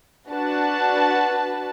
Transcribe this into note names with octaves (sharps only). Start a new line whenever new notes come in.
D4 F#4 B4 A5